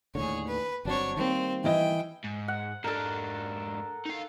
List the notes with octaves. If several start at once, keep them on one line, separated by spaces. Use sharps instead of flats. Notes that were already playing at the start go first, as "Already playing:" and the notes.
D#2 A2 D3 G#4 C#5
B4
G1 F#3 C4 D4 C#5
D#3 G3 A#3 C4
E3 E4 D#5 G5
G#2
F#5
G#2 D4 A4 A#4
D#4 F5